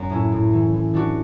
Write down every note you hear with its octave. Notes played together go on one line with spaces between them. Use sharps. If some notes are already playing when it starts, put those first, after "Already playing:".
Already playing: F#2
A2 C#4 E4
A2
E3
E3
E3 D4 F#4